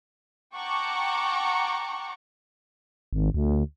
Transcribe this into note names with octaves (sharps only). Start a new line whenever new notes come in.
F#5 G5 A5 A#5 C#6 D6
G#1
D2